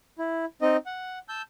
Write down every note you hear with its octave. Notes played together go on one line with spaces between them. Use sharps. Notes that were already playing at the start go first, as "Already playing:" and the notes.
E4
C4 D#4 D#5
F#5
A5 E6 G6